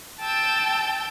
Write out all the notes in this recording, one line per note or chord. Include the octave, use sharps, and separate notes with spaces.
G5 A5 E6 G6